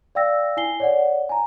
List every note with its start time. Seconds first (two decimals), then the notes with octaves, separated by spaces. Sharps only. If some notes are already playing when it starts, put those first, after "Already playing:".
0.15 D5 F5 G5 E6 A#6
0.57 E4 G#5 C7 G7
0.80 C#5 D5 F#5
1.29 G#5 A#5